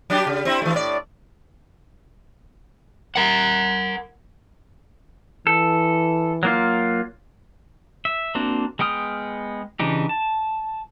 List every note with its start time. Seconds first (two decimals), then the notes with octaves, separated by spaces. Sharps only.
0.10 F#3 D4 G4
0.27 C#3
0.45 C4 E4
0.62 E3 A3
0.74 A2 D5
3.16 A#4 F#5
5.47 E3 A4
6.43 F#3 A#3 F4
8.05 E5
8.35 A#3 C4 D4 F#4
8.79 G#3 B3 G5 D#6 F6
9.80 C#3 E3 D4 D#4 G4
10.09 A5